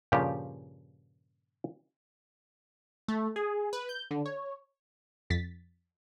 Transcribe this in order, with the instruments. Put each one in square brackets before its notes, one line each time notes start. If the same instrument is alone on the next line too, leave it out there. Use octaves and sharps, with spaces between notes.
[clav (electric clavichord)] G2 A#2 C#3 F3 F4 G4
[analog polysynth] A3
G#4
B4
G6
D3
C#5
[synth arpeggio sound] F2 A6 B6